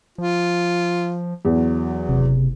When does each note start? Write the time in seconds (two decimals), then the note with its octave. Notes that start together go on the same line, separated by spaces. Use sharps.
0.18 F3 F4
1.45 E2 F#3
2.08 F#1 C3